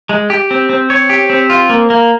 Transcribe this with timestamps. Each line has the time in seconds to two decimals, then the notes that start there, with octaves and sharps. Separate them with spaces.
0.09 G#3
0.30 G4
0.51 C4
0.69 C4
0.90 C#5
1.09 G4
1.30 C4
1.50 F4
1.70 A#3
1.90 A#3